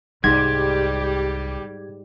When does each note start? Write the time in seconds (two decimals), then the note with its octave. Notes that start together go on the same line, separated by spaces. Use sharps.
0.24 C2 G#2 G3 G4 G#6